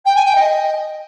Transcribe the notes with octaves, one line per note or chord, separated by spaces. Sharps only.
G5
G#5
G5
D#5